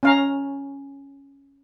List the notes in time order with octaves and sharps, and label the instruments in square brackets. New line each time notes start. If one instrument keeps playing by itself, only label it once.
[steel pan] C#4 F5 A#5